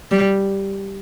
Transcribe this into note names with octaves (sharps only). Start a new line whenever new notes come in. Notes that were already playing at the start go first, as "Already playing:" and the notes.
G3